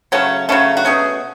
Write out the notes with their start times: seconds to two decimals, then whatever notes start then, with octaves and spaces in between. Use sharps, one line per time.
0.12 C#3 F#3 A3 C#4
0.49 C#3 F#3 A3 C#4
0.77 F#4
0.85 B2 A3 C#4 G#4